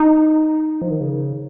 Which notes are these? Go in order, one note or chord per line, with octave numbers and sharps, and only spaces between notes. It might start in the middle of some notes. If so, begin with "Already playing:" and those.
Already playing: D#4
F3
D#3
C#3